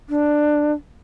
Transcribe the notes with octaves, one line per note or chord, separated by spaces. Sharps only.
D4